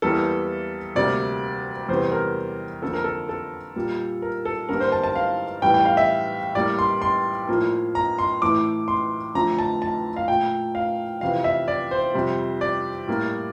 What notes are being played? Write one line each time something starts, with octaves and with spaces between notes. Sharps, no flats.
E2 E3 G3 A#3 A4
D2 C3 G3 A#3 D5
E2 C3 G3 C5
A#4
F2 D3 F3 A#3 A4
A#4
A4
A4
A#2 G3 A#3
A#4
A4
G2 D3 G3 A#3 A#4
C5
A5
A5
F5
A2 E3 G3 G5
G5
F5
E5
A2 G3 A#3 D5
C6
C6
A2 F3 A#3
A#5
C6
A2 E3 A3 D6
C6
F2 D3 F3 A3 A#5
A5
A5
F5
A#2 A3 G5
F5
F2 C3 E3 F5
E5
D5
C5
F2 C3 G3
D5
A2 G3 A#3